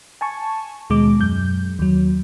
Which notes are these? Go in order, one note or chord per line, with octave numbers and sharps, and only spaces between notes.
G#5 A5 C#6
D#2 B2 G#3 D6
F#2 G6
D#2 F#3